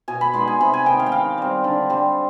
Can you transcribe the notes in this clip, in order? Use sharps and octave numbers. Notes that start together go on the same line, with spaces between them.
B2 G#5
B5
G#3 B3 D#4 C6
G#5
C3 B5
G#5
D#3 B3 G5
F5
G5
D#3 F5
G3 C4
D3
G3 C4